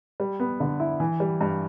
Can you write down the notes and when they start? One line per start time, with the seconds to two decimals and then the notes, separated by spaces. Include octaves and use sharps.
0.20 G3
0.40 B3
0.60 D3
0.80 E4
1.00 E3
1.20 G3
1.41 G2